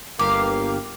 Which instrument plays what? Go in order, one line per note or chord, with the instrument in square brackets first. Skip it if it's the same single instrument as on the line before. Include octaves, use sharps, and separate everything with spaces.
[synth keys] G1 G4 F5 [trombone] A#3 [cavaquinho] D6